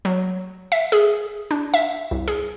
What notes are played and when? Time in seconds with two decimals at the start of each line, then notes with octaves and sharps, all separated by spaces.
0.05 F#3
0.72 E5
0.92 G#4
1.51 D4
1.74 E5
2.11 C2
2.28 G#4